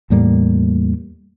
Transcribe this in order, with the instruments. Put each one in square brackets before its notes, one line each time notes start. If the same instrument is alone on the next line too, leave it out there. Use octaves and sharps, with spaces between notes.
[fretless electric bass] E2 A2 G3 A#3